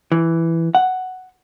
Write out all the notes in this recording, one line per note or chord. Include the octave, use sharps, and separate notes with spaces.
E3
F#5